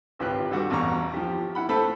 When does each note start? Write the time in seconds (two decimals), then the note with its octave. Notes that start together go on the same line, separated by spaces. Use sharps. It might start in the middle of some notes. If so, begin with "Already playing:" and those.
0.19 G#1 C#2 F4 G4 B4 F#6
0.51 D3 G3 F#4 D6
0.70 A1 E2 B2 A#5 C#6
1.14 F3 G4
1.55 E4 F#5 B5
1.69 A3 A4 C5 A5 B5